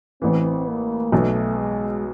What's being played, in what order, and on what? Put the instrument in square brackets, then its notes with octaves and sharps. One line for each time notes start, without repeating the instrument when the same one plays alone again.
[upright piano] A1 A2 E3 [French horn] C4
[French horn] A#3
[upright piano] B1 B2 F#3 [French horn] A3
[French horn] G#3